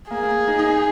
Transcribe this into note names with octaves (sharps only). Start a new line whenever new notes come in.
A#3 G#4
A#3
D#4
D#4